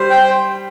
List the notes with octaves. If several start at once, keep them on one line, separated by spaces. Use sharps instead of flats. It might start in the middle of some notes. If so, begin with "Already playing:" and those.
Already playing: G3 C5
G5